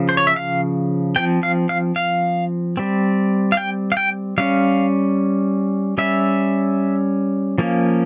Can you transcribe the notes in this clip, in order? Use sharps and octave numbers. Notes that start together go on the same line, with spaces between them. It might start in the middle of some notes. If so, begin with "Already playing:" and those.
Already playing: C#3 F3
C5
C#5
E5
F5
F3 C4 G5
F5
F5
F5
G3 C4
F5
G5
F5
G5
G3 C#4 F5
G3 C#4 E5
F3 A#3 C#4